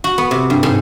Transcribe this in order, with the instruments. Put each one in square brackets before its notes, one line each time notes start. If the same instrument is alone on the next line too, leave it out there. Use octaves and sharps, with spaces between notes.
[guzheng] F#4
B3
C3
G2
G#2